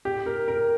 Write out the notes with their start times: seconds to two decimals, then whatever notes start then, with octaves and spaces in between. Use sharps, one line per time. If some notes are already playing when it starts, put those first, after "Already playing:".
0.05 G4
0.26 A#4
0.48 A#4